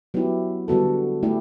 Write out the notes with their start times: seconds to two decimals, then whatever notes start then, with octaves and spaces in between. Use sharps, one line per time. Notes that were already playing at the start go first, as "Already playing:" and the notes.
0.14 F#3 B3 E4 G4
0.68 D3 G3 B3 F#4 A4
1.23 A3 E4 G4